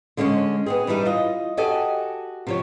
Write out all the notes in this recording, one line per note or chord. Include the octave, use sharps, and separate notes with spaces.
D3 G#3 C#4 C5 C#5
B3 C4 G#4
G2 E3 G3 D#4
F4 D#5
F#4 G4 A4 D#5 G#5
C3 F3 C#5